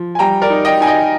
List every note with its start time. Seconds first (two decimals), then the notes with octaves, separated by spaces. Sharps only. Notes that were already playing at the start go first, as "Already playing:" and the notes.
Already playing: F3
0.15 G#5
0.19 G3 G5 A#5
0.42 A#4 D5
0.50 D#4
0.65 D#5 G5
0.80 D#4 G#5
0.87 D#5 G5